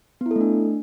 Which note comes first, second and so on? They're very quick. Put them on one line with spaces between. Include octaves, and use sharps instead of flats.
B3 E4 A4 A3 D4